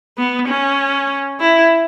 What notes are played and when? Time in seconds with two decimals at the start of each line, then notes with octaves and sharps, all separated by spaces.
0.18 B3
0.48 C#4
1.40 E4